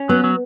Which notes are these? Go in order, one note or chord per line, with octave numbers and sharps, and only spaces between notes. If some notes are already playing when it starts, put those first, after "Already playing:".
Already playing: C#4
F#3 B3
F#3